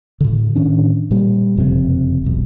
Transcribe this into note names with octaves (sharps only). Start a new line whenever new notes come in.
A2 D3
A2 D#3 C#4 D4
A#2 G3
F#1 F2 G#2 C3
E1 B1